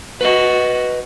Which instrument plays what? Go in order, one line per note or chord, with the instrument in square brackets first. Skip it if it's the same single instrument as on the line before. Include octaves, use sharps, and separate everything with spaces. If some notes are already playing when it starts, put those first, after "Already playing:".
[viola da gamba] F#4 [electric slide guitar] B4 D#5